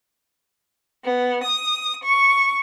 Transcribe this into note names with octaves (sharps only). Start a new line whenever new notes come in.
B3
D#6
C#6